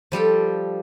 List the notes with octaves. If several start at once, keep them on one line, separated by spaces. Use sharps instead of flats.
F3 G3 A4 G5